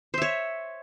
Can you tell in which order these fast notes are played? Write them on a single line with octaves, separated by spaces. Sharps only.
C5 E5 C#5